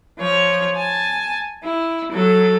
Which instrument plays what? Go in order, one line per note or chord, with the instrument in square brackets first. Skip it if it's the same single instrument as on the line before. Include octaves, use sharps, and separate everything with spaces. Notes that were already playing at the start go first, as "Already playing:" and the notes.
[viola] F3 C#5
G#5 A5
E4
F#3 A4